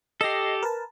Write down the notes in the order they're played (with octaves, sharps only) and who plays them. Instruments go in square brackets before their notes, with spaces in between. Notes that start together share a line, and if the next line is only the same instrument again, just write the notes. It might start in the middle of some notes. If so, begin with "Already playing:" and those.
[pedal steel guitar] G4 A4 [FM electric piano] D#5 A#6 C7
[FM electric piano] A#4 B4 A5